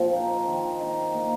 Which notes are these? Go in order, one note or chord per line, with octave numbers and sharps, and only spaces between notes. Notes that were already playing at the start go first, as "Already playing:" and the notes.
Already playing: A#2 F3 C4
D#4
D#3
D#4
A#3